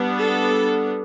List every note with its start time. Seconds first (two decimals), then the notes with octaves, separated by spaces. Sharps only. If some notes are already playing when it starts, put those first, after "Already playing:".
Already playing: G3 B3 D4
0.20 A4